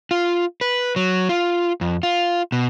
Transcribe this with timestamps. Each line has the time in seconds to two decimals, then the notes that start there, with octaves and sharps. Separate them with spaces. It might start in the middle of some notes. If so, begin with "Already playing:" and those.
0.11 F4
0.61 B4
0.96 F#3
1.29 F4
1.81 F2
2.03 F4
2.52 B2